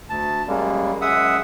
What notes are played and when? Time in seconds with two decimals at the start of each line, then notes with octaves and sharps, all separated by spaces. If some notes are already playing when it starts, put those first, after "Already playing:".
0.09 D2 A5
0.47 F#2 G3 G#3 A#3
1.01 F#2 G#3 E5 F#5 D#6 E6